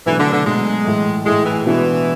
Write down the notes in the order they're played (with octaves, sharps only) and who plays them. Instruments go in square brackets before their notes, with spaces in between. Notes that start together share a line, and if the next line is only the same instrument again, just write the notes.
[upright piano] B2 F#3 A3 D4 [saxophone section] E3
[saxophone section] D3
D3
[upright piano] B2 F#3 A3 D4 [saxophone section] G#3
[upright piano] A2 E3 A3 E4
[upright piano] A2 E3 A3 E4 [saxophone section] G#3
[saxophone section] E3
[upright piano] B2 G#3 B3 D4 F#4 [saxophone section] E3